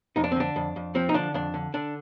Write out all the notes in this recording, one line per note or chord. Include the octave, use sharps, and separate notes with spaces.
F2 D#4
D4
C4
D3 D4
F2
F2
F3 C4
D#4
D3 D4
F2 D4
D3
D3 D4